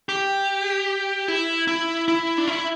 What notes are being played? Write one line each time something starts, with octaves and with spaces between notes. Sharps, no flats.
G4
E4
E4
E4
D4
E4